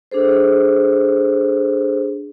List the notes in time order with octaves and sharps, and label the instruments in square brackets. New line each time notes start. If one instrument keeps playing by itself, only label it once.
[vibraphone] D4 G#4 A4 C5